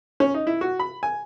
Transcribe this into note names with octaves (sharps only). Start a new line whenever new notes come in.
C#4
D#4
E4
F#4
B5
G#5